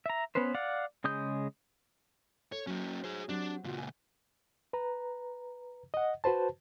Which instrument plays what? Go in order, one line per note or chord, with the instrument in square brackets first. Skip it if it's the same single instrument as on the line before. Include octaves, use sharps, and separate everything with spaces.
[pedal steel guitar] E5 A#5
B3 C#4 B4 C5
D5 F5 F#5
C#3 G#3 D#6 G6
[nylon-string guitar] A4 [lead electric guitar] C#5
[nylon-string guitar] F#3 [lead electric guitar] A#3 C#4
[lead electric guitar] G#4 C5
[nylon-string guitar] F#3 C4 G4 [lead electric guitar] D4
[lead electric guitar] C#2 A#2 [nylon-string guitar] F4 F#4
[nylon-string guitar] G#5
[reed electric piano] B4 A#5
D#5 F#5
F#4 B4 C5 A5